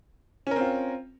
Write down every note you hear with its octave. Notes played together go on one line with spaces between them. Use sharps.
C4 C#4 F4 A#4